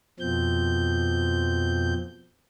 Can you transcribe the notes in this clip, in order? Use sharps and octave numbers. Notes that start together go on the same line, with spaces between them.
F2 B2 F3 C4 G6